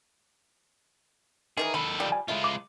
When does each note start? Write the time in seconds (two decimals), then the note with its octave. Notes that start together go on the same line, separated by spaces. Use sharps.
1.57 D#3 E3 G#4 A#4
1.74 D#3 A4 B5
2.00 F3 G3
2.12 G#5
2.28 G#3 A3 E4 F4
2.44 D6